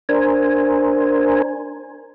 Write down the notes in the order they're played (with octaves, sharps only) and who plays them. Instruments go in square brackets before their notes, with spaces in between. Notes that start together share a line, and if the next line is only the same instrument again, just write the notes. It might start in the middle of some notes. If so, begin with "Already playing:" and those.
[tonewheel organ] D4 A#4 C5 G#5